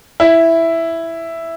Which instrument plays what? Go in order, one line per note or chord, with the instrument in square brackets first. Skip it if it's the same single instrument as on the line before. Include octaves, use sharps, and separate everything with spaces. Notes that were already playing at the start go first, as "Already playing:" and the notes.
[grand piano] E4